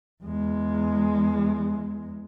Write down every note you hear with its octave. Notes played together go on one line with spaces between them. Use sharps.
E2 G#3